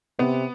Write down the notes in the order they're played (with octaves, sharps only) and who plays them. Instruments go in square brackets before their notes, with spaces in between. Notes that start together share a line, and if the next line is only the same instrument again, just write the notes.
[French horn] C3 [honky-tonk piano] B3